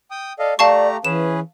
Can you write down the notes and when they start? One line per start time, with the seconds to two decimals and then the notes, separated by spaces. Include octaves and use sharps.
0.11 G5 D#6
0.39 A4 D5 D#5 F5
0.59 A3 G4 D5 F5 A5 A#5 C#6
1.05 E3 C#4 G#4 B4 E7